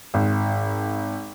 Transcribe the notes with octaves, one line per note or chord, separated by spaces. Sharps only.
G#1